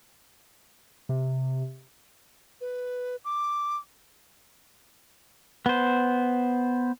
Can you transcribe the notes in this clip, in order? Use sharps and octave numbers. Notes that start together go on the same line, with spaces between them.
C3
B4
D6
B3 C5